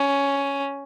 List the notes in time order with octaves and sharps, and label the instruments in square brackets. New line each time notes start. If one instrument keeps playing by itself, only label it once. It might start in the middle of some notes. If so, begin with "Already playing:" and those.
Already playing: [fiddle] C#4